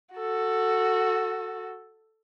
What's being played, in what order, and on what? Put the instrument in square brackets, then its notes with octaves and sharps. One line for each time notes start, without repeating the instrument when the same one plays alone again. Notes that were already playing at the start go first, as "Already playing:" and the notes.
[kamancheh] F#4 A4